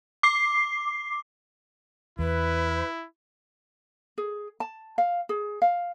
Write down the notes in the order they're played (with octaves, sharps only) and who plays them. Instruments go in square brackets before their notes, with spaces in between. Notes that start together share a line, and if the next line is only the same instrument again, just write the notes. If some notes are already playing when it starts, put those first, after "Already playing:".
[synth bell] D6 C7
[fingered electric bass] E2 [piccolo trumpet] E4 [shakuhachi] B4
[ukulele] G#4
A5
F5
G#4
F5